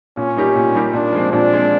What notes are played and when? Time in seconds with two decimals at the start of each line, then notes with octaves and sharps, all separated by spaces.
0.17 A#2 C#4
0.36 G3 A#3 D#4 G4
0.55 A#2
0.74 G3 A#3 D#4 G4
0.93 A#2 D4
1.13 F3 G#3 C4
1.32 A#2 D4
1.52 F3 G#3 C4